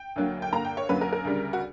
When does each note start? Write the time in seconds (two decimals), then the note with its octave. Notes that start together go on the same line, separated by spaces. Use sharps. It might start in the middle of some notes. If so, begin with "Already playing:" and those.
Already playing: G5
0.16 D2 D3 F#3 A#3
0.42 G5
0.52 G2 D3 A#3 A#5
0.65 G5
0.77 C#5
0.89 F#2 D3 F#3 A#3 B4
1.01 A#4
1.13 A#4
1.25 D2 C#3 G3
1.53 F#4